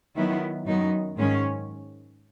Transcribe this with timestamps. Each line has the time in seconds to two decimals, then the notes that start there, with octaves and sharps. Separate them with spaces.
0.17 D#3 F#3 B3 E4
0.67 F#2 D#3 F#3 B3 D#4
1.17 G#2 D#3 G#3 C#4